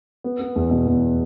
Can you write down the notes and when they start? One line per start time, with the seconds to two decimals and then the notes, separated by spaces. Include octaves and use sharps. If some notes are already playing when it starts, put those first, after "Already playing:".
0.24 B3
0.40 B3
0.56 E2
0.71 B2
0.87 E2